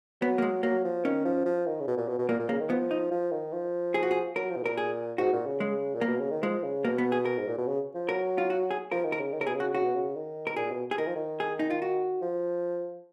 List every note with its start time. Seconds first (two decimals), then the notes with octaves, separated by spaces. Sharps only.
0.21 F#3 B3
0.38 A#3
0.42 G#3
0.63 F#3 A#3
0.84 F3
1.04 D#3 C#4
1.25 F3
1.46 F3
1.67 D#3
1.80 C#3
1.87 B2
1.97 A#2
2.08 B2
2.18 B2
2.29 A#2 A#3
2.40 A#2
2.49 C#3 A#3
2.60 D#3
2.70 F3 B3
2.91 D#4
3.11 F3
3.32 D#3
3.53 F3
3.94 G#4
4.03 F#4
4.11 G#4
4.36 F#3 A#4
4.50 F3
4.56 B2
4.63 A#2 A#4
4.77 G#4
5.18 G#2 F#4
5.33 A#2
5.46 C#3
5.60 G#3
5.95 A#2
6.01 A#3
6.07 B2
6.20 C#3
6.31 D#3
6.43 F3 G#3
6.63 C#3
6.85 B2 A#3
6.98 B3
7.12 G#4
7.25 A#4
7.38 G#2
7.48 A#2
7.58 B2
7.67 C#3
7.95 F3
8.09 F#3 A#4
8.38 F4
8.50 F#4
8.71 G#4
8.91 F3 A#4
9.05 D#3
9.12 A#4
9.19 C#3
9.33 D#3
9.40 C#3 A#4
9.47 B2 G#4
9.55 C#3 F#4
9.74 C#3 F#4
9.84 B2
9.94 C#3
10.15 D#3
10.47 A#4
10.56 A#2 G#4
10.71 B2
10.91 G#4
10.98 D#3 A#4
11.07 F3
11.16 D#3
11.40 G#4
11.59 D#4
11.70 F4
11.82 F#4
12.22 F3